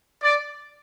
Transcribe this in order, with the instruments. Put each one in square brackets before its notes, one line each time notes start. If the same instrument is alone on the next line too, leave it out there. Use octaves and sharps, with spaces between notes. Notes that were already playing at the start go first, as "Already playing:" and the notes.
[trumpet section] D5